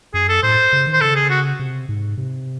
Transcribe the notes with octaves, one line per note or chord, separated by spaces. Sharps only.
F#2 G#4
A4
A2 C5
C#3
D#3
C5
C#3 A4
G#4
F#4
C3
G#2
C3